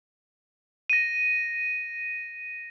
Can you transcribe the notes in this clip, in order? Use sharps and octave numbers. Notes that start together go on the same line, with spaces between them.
A#6 D#7